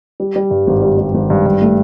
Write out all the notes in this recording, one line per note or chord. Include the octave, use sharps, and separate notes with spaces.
G3
G3
G2
G#1
G3
G3
G#1
G2
G2
A3